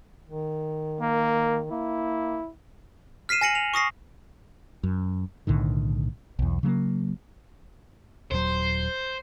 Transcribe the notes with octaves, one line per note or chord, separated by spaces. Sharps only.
D#3
A#3
A#3 E4
F6 B6 C7 D#7 E7
G#5 A#6 C#7 F#7
F7
C#6 D#6 A#6 C7
F#2
B1 A2 D3 D#3
B1 E2
C#3 F#3 A3 A#3
D#1 F#3 C5